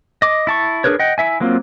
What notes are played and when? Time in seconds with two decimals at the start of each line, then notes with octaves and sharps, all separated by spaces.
0.22 D#5 D6
0.47 E4 A5 C#6
0.84 D4 G#4 A#4 B4 C#5
0.99 D#5 F#5 G5
1.18 E4 E5 G#5
1.40 F#3 A#3 C4 F4